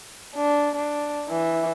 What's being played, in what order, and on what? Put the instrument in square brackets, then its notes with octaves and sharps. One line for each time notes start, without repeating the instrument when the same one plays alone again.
[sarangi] D4
D4
E3